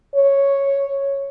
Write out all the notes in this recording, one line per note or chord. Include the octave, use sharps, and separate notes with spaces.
C#5